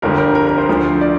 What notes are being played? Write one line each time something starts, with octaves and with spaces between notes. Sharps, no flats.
G1 F2 D3 G3 A#4
A#4
A#4
A#4
C5
D2 D3 F3
D5